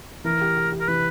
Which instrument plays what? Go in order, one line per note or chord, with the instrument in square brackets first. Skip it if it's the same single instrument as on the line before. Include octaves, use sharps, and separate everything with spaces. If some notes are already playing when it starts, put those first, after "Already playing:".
[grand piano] E3 [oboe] A#4
[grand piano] G4
G4
G4
[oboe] A#4
[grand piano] E3 [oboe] B4